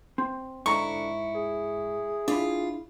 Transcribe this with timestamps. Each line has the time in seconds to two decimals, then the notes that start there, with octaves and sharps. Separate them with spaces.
0.18 C4
0.66 G#2 D3 E4 A#5 C#6
1.35 G#4
2.28 D4 E4 F4